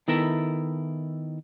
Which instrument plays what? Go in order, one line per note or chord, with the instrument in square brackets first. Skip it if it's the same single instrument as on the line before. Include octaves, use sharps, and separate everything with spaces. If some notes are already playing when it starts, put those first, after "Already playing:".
[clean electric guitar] D#3 B3 E4 A4 A#4 E5